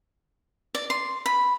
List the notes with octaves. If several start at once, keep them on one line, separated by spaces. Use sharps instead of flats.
D5
C6
B5